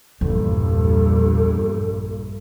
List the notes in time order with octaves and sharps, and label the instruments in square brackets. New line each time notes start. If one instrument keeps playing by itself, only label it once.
[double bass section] A#1 G2 [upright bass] E2 [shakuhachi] A4